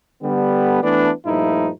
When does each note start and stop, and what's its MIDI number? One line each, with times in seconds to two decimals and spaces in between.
0.23 0.80 50
0.23 0.80 55
0.23 0.80 59
0.83 1.10 52
0.83 1.10 57
0.83 1.10 59
0.83 1.10 62
1.26 1.69 43
1.26 1.69 46
1.26 1.69 53
1.26 1.69 57
1.26 1.69 63
1.26 1.69 64